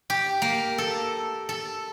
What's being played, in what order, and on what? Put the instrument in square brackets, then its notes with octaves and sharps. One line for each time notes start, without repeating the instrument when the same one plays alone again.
[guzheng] G4
A#3
A4
A4